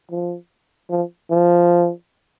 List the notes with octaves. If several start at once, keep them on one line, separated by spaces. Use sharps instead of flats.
F3
F3
F3